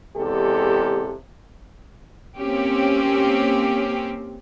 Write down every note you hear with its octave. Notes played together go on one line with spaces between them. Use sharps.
E2 C3 G#3 G4 A4
A#3 C4 C#4 G4